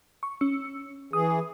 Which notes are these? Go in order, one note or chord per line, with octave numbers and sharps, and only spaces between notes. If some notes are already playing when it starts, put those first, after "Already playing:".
C#6
C#4 E6 C#7
E3 G#4 D#6